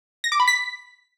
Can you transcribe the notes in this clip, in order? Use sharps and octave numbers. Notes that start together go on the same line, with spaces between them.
A#6
D6
B5
B6